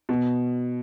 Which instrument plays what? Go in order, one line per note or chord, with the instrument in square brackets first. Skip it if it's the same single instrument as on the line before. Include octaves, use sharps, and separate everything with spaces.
[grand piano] B2